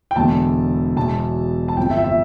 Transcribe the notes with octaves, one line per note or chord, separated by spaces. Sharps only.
G5
E1 E2 D3 A5
E1 E2 B2 A5
A5
G1 F2 C3 F3 G5
E5
E5